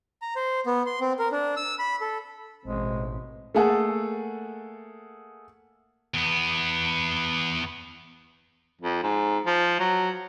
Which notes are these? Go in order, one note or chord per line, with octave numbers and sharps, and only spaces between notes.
A#5
C5
B3
C6
C4
A#4
D4
E6
B5
A4
A1 G#2 B2 G#3 C4
A3 A#3 G#4 A4 F#5
E2 B3
F2
G#2
F3
F#3